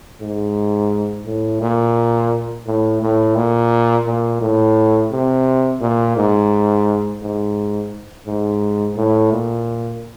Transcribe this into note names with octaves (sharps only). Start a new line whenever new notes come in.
G#2
A2
A#2
A2
A2
A#2
A#2
A2
C3
A#2
G#2
G#2
G#2
A2
A#2